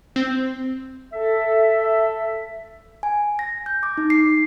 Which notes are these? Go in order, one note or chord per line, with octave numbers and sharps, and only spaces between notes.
C4
A4 E5
G#5
A#6
G6
D6
D#4
C7